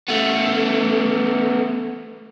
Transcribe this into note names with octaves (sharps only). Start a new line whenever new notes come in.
A3 B3